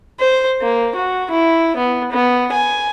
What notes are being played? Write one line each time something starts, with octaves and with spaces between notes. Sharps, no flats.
C5
A#3
F#4
E4
B3
B3
G#5